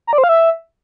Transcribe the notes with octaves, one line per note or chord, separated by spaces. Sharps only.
A#5
D5
C5
F5
E5